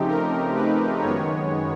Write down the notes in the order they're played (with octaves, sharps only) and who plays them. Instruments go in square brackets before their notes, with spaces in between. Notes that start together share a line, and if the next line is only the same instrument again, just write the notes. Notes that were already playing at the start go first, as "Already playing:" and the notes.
Already playing: [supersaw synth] C#3 F3 A3 C4 D#4 G4
A#4
B4
F#2 D#3 G#3 B3 C#5